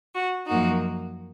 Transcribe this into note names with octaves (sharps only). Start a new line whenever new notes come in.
F#4
F#2 F3 A#3 D#4 F#4